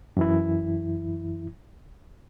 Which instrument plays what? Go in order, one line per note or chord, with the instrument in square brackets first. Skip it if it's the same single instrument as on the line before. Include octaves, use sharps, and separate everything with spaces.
[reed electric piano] F#2 E3 E4